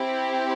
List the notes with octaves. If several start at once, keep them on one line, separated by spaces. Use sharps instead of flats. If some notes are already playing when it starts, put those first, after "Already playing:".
Already playing: C4 E4 G4